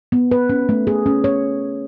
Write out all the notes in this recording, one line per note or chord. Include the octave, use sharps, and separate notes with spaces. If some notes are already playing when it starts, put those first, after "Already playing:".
B3
B4
C#4
A3
G#4
C#4
C#5